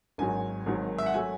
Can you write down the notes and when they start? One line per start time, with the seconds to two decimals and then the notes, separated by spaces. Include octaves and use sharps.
0.18 G#1 G#2 D#3 F#3 G#5
0.66 G#1 G#2 D#3 F#3
0.98 E5
1.06 F#5
1.14 F#3 A3 G#5